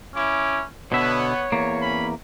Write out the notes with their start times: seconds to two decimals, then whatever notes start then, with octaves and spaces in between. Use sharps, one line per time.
0.15 C#4 E4 D6
0.92 B2 D3 B3 C#5 E5
1.52 E2 A#3
1.81 C#4 B5